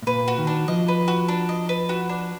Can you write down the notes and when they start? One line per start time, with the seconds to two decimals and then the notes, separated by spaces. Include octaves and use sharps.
0.02 A2
0.07 A#2 B4
0.28 F#4
0.38 D#3
0.47 D4
0.68 F3 D#5
0.88 B4
1.08 F#4
1.29 D4
1.49 D#5
1.69 B4
1.89 F#4
2.09 D4